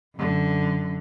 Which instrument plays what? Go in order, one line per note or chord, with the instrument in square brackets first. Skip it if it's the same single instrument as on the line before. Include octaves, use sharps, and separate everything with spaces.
[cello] F#2 D3